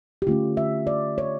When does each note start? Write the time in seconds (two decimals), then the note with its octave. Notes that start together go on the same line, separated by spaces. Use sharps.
0.22 G4
0.27 D3 A3 C#4 F4
0.57 E5
0.87 D5
1.18 C#5